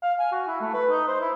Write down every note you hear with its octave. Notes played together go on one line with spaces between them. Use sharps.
F5
G#5
F#4
E4
A3
B4
D#4
C5
E4